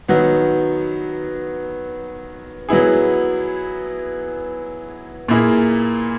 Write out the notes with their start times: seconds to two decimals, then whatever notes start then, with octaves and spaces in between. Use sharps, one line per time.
0.08 D#3 F#3 B3
2.69 F#3 B3 E4 G#4
5.28 A#2 A#3 E4 G#4